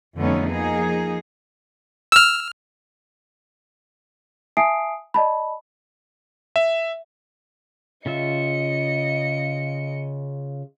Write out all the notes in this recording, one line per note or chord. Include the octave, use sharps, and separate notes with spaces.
F2 D3 A3 B3 C#4 D#4
F3 A#3 D#4 G#4
E6 F6
E5 G#5 A5 D#6 C7 D7
D5 D#5 A5 B5
E5
C#3 F4 D#5 E5 C#7